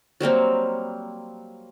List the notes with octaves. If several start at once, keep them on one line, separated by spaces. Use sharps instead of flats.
F#3 G3 A#3 C4